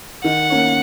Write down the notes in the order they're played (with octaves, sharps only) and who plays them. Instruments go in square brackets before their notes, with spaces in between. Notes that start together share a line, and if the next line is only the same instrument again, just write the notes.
[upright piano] D#3 [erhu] F#5
[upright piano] A#3 C#4 A#4 C#5